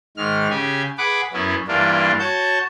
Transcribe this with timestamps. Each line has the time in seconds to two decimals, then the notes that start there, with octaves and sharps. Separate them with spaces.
0.17 G#2 D#3 F6
0.50 C#3 G4 G#5
0.98 G#4 B4 F#5 B5 D6
1.33 F#2 B3 C#4 E4
1.68 G2 E3 A#3 D4 F4
2.19 F#4 C#5 A5 G6